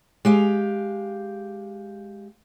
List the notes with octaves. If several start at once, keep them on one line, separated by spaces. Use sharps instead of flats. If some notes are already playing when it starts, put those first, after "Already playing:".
G#3 G4 F5